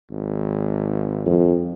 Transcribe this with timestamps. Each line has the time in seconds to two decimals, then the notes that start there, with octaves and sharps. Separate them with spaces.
0.11 G#1
1.26 F2